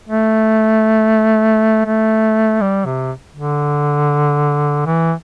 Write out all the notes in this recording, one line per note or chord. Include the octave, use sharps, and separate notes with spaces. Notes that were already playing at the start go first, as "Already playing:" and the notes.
A3
A3
G3
C3
D3
E3